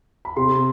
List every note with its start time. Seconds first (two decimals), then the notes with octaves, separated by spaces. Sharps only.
0.25 B5
0.36 C3 C6